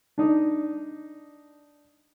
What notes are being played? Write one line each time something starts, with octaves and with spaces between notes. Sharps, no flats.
D4 D#4 D5